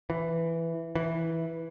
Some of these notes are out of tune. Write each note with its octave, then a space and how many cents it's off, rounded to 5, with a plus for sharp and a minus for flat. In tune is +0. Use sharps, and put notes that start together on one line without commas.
E3 +5
E3 -5